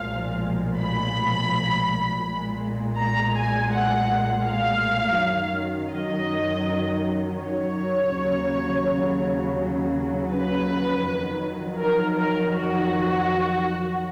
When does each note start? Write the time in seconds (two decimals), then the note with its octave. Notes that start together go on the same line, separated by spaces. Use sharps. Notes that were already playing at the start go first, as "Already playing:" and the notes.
Already playing: B1 A#2 F3 G#3 F5
0.78 B5
2.25 B1 A#2 G#3
2.98 A#5
3.35 G#5
3.72 F#5
4.45 F5
5.18 F#2 D#3 F#3
5.92 D#5
7.39 C#5
8.13 D#2 C#3 F#3
10.34 B4
11.06 F2 D#3 F#3
11.80 A#4
12.17 A#4
12.55 F#4